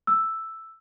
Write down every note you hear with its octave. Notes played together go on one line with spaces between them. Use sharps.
E6